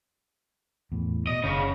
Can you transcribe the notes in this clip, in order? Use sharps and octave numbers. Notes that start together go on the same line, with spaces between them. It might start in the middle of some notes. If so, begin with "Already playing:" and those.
E2 A2
B2 D#5
F#1 C#3